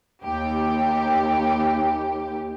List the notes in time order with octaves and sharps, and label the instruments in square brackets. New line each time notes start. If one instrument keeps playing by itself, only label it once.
[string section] D#2 G4